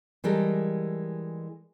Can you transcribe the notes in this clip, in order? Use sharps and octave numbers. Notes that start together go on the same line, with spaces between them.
E3 G3 G#3 A4 A#4